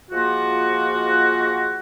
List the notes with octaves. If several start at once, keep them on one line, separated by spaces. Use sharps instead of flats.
F3 G#3 A#3 F4 F#4